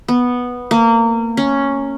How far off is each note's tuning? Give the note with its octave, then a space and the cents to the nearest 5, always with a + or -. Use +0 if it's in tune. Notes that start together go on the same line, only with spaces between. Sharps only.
B3 -5
A#3 -25
C#4 +0